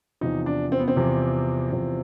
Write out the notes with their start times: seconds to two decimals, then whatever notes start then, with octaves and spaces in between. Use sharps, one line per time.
0.21 E2 C3 F3 D#4
0.46 D4
0.72 C4
0.79 B3
0.88 C4
0.96 E2 C3 F3
1.71 E2 C3 F3